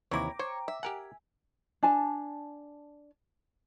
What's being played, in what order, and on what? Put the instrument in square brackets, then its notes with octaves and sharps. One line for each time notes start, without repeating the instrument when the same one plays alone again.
[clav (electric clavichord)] D#2 C3 E3 [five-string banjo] E4 C#5 [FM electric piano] G5 A#5 D6
[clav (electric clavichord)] C5 [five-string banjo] C#5
[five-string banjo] E5
[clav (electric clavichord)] G4 A#4 F#5 [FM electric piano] G#5
[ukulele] D4 G#5 A5